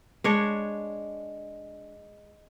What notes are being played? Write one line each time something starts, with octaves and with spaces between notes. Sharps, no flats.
G#3 D4 C#5